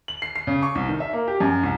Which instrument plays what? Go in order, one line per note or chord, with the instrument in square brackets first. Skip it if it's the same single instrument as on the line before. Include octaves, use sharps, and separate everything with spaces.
[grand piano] F#7
C7
C7
C#3
C#6
C2
D#3
E5
A#3
G4
F#2
C2